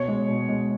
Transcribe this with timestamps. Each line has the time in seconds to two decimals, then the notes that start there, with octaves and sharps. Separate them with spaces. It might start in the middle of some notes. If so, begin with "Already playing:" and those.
Already playing: B2 C#5
0.08 G#3
0.28 B2
0.49 G#3